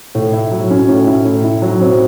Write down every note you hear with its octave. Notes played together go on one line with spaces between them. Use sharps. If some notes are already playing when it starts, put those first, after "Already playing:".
A2
E4
F#3
C#4
A2
E4
A2
E4
F#3
C4